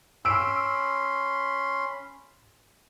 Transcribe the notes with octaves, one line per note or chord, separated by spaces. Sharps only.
C#4 B5 C6 E6 D7